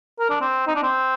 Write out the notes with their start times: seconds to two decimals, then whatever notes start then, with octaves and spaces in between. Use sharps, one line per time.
0.20 A#4
0.30 D4
0.41 C4
0.68 D#4
0.76 D4
0.83 C4